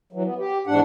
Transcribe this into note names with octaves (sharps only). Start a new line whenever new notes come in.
E3 F#3
B3
G4
E2 G#2 D4 F#5